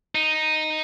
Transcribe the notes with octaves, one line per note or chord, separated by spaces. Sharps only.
D#4